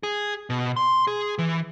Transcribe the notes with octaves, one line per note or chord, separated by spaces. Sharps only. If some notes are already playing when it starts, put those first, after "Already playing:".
G#4
B2
C6
G#4
E3